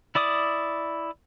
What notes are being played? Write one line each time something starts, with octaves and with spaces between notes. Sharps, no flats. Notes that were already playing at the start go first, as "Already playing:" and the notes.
E4 D5 D6 D#6